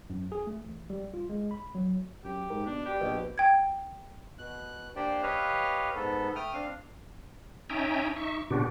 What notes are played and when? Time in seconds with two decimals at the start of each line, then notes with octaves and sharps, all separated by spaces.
0.10 F#2
0.32 G#4
0.47 A3
0.65 A1
0.90 G3
1.14 F4
1.29 G#3
1.51 B5
1.75 F#3
2.25 F#2 G4
2.50 G#2 A#4
2.66 B2 D4
2.86 G3 G4
3.01 A#1 B2
3.38 G5 G#6
4.38 B2 F#6
4.96 A#3 D4 G4 C5 D5 G5
5.23 G4 B4 C#5 D#5 F5
5.95 G#2 B3 A4
6.36 A3 G5 D#6 F6
6.54 C4 D4 F5
7.70 C#4 D#4 E5 G5 G#5 A#5
8.16 D#4 E5 C#6
8.51 A#2 C#3 B3 D4 F#4 G4